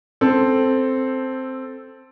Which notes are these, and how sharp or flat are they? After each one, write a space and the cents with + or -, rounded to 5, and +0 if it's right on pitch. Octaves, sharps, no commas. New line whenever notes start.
C4 +0 A4 +0